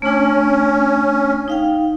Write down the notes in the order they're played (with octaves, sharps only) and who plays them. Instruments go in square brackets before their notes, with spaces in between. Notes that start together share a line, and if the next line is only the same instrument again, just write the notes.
[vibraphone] A3 D4 [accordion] C#4
[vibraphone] D#4 F5 G5